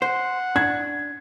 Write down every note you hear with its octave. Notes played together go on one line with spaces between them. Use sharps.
C5 F#5
D4 G#6